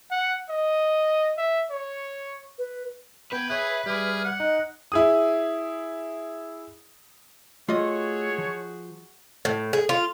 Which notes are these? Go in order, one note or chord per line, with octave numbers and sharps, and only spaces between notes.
F#5
D#5
E5
C#5
B4
B3 B4 G5 G#6
G#4 C#5 E5 F#6
G3 G#4 E5 D6 F6
F#5
D#4 D#5 F#6
E4 G#4 D#6
A3 F4 F#4 G#4 C#5 D#5
F3
A2
G#4
F4